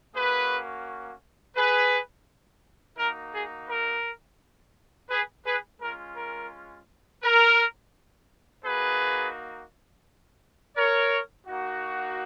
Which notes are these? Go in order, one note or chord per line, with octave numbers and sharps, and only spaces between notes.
A#3 C#4 F#4 G#4 B4
G#4 B4
A#3 D#4 F#4 A#4
G#4
A#4
G#4 B4
G#4 B4
G#3 C#4 F4 A#4
A#4
A#4
A#3 D#4 F#4 G#4 B4
A#4 C#5
A#3 D#4 F#4